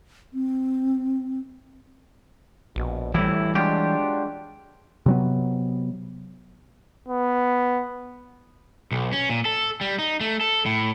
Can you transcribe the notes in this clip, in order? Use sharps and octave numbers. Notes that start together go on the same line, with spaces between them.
C4
A#1 B2
A2 E3 G3 E4
F#3 G#3 D4 F4 G4
C3 F#3 B3
B3
B1
C#4
A#2
A4
G3
D#4
A3
A4
A2